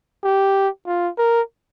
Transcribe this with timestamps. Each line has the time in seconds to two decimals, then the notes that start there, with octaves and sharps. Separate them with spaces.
0.24 G4
0.87 F4
1.19 A#4